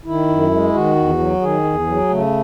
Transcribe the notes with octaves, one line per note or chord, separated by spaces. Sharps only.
D#3 E4
F#2
G#3
D#3 F#4
E2
F#3
D#3 G#4
E2
F#3
C#3 A3